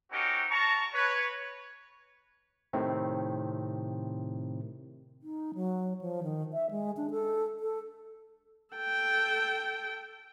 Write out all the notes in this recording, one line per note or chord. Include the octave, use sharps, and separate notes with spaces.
C4 C#4 D#4 F#4 G4 A#4
A5 A#5 C#6
B4 C#5
A2 C3 D#3 C4
D#4
F#3
F3
D#3
E5
G#3
D4
A4
A4
A4 G5